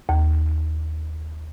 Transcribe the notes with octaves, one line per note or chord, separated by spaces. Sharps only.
D#2